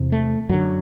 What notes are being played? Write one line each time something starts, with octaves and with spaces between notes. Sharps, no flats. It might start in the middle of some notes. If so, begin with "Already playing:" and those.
Already playing: E2 C3
A3
F#2 D3 F#3